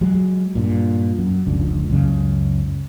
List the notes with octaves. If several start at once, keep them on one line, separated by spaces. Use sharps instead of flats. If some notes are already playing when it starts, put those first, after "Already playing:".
F#3 G#3
G2 A#2
F#2
F1 C#2 D3
C#2 F#2 C#3 G#3